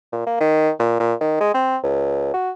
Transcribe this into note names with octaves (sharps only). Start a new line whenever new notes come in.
A#2
A#3
D#3
A#2
A#2
D#3
G#3
C4
C#2
F#4